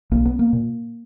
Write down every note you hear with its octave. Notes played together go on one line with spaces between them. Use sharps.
B1 A#3
B3
A#3
A#2